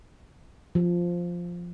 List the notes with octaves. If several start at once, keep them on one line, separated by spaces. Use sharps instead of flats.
F3